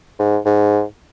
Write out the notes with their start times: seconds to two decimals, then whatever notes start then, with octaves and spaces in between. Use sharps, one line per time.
0.19 G#2
0.45 G#2